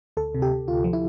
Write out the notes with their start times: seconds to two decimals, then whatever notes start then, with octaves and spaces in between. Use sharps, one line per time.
0.17 D2 A4
0.35 C3
0.42 G4
0.51 C3
0.67 D2 F4
0.84 F3
0.93 E4